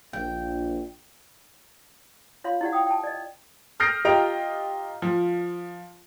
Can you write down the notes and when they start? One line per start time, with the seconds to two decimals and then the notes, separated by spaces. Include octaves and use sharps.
0.13 A#1 G5
2.44 F4 C#5 F5 C6
2.61 E4 G4 D5 F#5
2.73 G5 D#6
2.86 G5 A5
3.04 D5 D#5
3.80 D#6 F6 G6 A#6 C7 D7
4.05 F4 G4 D#5 A#5 D7 F7
5.02 F3